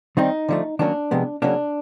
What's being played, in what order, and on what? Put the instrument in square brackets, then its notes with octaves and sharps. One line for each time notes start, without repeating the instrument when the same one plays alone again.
[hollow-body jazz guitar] D#3 G3 C4 D#4
D3 F3 A3
D#3 F#3 A#3 C#4 D4
C3 F3 G#3 B3
C#3 F#3 A#3 C#4 D4